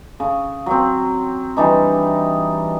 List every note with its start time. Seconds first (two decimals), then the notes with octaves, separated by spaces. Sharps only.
0.20 C#3
0.66 F#3 C4
1.57 E3 G3 D4 D#4